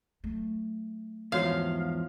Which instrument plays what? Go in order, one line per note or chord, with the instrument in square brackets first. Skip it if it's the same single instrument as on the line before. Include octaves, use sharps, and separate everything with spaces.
[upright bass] F#3 A3
[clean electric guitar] E2 G#2 F3 [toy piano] F#4 C#5 D5 [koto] F5